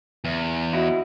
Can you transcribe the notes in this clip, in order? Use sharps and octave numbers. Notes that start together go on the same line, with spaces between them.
E2
D#4 E4 F#4